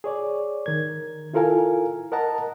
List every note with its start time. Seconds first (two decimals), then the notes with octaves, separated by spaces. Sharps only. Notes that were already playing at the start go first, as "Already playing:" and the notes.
0.04 G#4 C#5 D5
0.66 D#3 A#4 G#6
1.34 E4 F4 A4 A#4 F5 G#5
2.12 A#4 D#5 F#5 A5 A#5